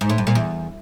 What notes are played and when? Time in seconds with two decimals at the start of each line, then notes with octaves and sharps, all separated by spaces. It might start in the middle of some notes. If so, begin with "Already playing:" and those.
0.01 G#2
0.09 A2
0.18 G2
0.27 A#2
0.35 E2